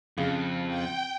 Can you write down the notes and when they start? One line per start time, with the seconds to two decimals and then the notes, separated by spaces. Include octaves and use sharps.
0.18 F2 C#3
0.69 G5